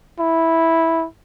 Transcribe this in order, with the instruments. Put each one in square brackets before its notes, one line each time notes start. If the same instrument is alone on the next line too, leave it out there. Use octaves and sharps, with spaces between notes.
[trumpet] E4